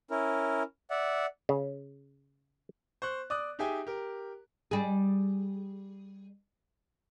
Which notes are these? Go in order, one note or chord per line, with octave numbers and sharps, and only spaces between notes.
C#4 E4 A#4
D5 E5 F#5
C#3
C5 C#6 F#6
D5 D6 D#6 F#6
D#4 G4 G#4 E5 G5 G#5
G4 A#4
G3 G#4